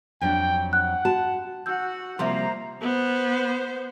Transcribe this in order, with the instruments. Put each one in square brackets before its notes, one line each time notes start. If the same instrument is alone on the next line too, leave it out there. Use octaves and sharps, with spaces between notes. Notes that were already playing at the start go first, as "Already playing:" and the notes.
[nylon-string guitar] F2 F#3 D4 [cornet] G5
[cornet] F#5 [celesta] F#6
[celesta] F#4 [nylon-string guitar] A5
[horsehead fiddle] F#4 F#5 [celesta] E6 G6
[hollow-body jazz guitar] C3 F3 G3 [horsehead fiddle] A#3 [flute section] C5 A#5 [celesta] E5 C6
[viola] B3 C5